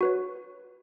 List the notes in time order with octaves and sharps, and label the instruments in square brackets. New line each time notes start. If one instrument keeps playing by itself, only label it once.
[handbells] F#4 B4 C#5